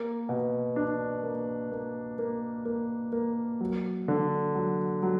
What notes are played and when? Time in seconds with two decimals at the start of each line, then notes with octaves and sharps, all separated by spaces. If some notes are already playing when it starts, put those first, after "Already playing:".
Already playing: A#3
0.29 B2
0.76 D4
1.23 A#3
1.72 A#3
2.19 A#3
2.65 A#3
3.13 A#3
3.61 F#3
4.08 D3
4.55 F#3
5.03 F#3